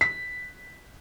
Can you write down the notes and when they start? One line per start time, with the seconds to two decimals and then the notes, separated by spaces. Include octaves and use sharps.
0.01 B6